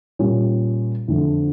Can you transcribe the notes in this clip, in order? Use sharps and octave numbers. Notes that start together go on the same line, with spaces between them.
A#2 G3 C#4
F2 D3 A3